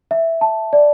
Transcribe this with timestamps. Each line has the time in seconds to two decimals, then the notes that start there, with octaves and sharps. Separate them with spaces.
0.11 E5
0.41 A5
0.73 D5